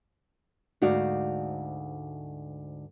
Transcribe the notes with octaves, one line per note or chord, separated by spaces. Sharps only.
D2 G#2 F#4 D5 F5